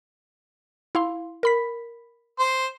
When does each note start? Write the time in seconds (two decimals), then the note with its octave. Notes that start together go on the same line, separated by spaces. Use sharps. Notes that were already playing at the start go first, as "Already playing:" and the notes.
0.95 E4 F5 C6
1.43 A#4 B5 B6
2.39 C5